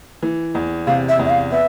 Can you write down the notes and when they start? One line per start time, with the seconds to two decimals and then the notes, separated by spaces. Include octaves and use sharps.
0.23 E3
0.55 E2
0.87 C3 F5
1.09 E5
1.19 E2
1.26 E5
1.30 F5
1.52 B3 E5